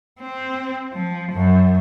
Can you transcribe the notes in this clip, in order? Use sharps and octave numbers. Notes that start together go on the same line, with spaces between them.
C4
F3
F#2